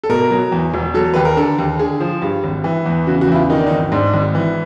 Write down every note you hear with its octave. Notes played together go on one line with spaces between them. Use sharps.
A4
B2 A#4
F#3
E2
E1
F#3 A4
D#2 B4
A#4
D3 A4
D#2
D3 G#4
F3
G2
G#1
E3
E2
C#3 F#4
F#4
E2 E4
F4
D#3 D#4
D4
D#4
G#1
G#2 D4
G#1
E3